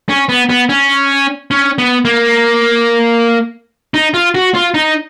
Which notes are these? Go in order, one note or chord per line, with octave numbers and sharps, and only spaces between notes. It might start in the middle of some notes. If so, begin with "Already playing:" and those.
C#4
B3
B3
C#4
C#4
B3
A#3
D#4
F4
F#4
F4
D#4